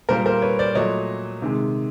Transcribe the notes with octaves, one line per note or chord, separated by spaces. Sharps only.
A#2 G3 A#3 A#4 C5
A#4 C5
B4 C#5
C5 D5
A#2 F#3 A3 C#5 D#5
C3 D#3 G#3